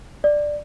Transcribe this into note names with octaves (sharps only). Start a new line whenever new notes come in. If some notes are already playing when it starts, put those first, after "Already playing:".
D5